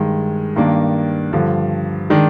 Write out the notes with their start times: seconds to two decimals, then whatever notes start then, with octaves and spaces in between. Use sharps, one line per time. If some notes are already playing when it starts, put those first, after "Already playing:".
Already playing: G2 D#3 G#3
0.56 G2 D#3 A#3 D4
1.33 G2 D3 F3
2.10 D#3 G#3 D4